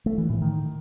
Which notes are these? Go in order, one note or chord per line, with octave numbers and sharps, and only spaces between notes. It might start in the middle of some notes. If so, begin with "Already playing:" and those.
A3
E3
A2
D#3